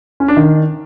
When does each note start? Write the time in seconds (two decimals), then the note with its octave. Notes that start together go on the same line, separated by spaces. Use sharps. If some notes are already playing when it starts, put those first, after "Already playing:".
0.20 C#4
0.28 D4
0.37 D#3